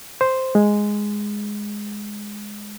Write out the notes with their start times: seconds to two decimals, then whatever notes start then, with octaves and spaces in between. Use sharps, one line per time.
0.21 C5
0.55 G#3